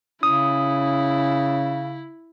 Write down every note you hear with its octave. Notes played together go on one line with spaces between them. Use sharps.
C#3 C#4 E4 D#6